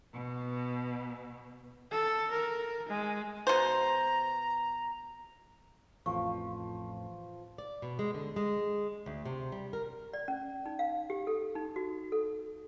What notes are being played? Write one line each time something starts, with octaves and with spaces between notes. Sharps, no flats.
B2
A4
A#4
G#3
B2 C5 A#5
A1 F2 F3 C#6
D5
B2
G#3
D3
G#3
D2
C3
G3
A#4
D5
C#4
D#4
F5
G4
A4
D#4
F#4
A4